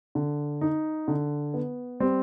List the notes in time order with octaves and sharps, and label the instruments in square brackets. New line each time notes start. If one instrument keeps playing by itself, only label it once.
[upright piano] D3
D#4
D3
B3
[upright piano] G3 [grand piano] C4